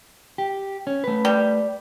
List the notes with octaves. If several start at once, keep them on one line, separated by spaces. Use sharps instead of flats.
G4
C#4
A3 B4
G3